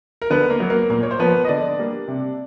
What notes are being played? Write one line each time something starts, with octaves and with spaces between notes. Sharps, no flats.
A#4
D3 B3 B4
A#3 A#4
F#3 B3
A#3 A#4
A#2 A#3 A#4
C#5
C5
F3 A#3 B3 B4
D#5
D3 D4 D5
G3 A#3
C3